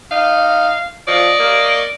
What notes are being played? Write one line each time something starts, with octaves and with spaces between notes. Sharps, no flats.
D#4 F5
F3 D5 D#5 C#6
A#3